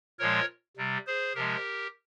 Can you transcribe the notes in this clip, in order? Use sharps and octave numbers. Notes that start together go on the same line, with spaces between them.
A#2 F3 G#3 A#4 C#5
C3 G3
G#4 C5
C3 F3 G#3 G4 A#4